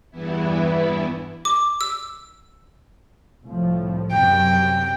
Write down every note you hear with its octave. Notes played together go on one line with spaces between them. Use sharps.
E2 G2 E3 B3 E4
D6
E6
C2 A2 F3
F#2 C3 G5